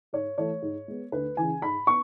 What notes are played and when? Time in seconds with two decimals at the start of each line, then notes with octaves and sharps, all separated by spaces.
0.13 G#2 C#5
0.38 E3 A3 C#5
0.62 G#2
0.88 G#3 B3
1.12 D2 B4
1.37 C#3 E3 G#5
1.62 G#2 B5
1.87 B3 C#6